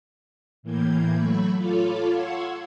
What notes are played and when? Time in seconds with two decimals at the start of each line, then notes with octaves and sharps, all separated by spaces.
0.63 A2 E3 A#3 G6 G#6
1.15 F#3 A3 B5 C#6
1.57 F4 A4 C#5 F5 B5 D6
2.11 F5 F#5 C6 C#6 E6 G#6